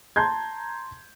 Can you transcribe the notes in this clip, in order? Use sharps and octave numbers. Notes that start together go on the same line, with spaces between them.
A5 A#5 C6 G6 G#6